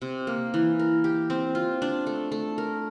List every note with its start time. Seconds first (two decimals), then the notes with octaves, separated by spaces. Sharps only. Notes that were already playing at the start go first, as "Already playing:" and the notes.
0.02 C3
0.27 A#3
0.54 E3
0.79 A#4
1.04 G4
1.30 C4
1.55 F4
1.82 D4
2.07 A3
2.32 A3
2.58 A#4